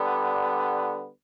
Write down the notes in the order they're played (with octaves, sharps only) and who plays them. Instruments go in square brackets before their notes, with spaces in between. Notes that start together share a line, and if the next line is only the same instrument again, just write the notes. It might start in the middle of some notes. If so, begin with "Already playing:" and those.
Already playing: [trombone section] D3 G3 B3